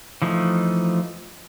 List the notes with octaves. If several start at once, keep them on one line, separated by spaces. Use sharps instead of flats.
E3 F3 A3 D#4